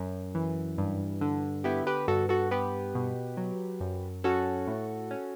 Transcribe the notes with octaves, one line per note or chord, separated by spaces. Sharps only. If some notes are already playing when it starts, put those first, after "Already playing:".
Already playing: F#2
E3
G2
D3
B3 E4 G4
G4 B4
G2 F#4 A4
F#4 A4
B3 G4 B4
B2
F#3
F#2
C#4 F#4 A4
A2
C#4